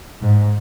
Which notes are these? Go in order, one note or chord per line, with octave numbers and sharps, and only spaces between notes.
G#2